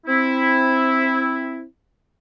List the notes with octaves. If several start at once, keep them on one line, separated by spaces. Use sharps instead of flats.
C4 E4